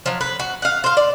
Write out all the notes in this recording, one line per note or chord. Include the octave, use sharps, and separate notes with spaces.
F3 F#3
B4
F#4
F5 F#5
C5 F5
D5